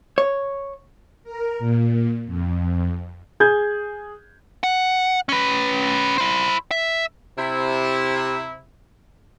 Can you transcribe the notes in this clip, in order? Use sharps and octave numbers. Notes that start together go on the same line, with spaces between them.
C#5
A#4
A#2
F2
G#4 G6 G#6
F#5
C#4 B4
E4 C5
E5
C3 E4